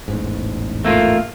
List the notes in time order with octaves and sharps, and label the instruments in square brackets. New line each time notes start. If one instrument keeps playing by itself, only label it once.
[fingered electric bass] E1 A1 G#2
[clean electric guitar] A3 A#3 F4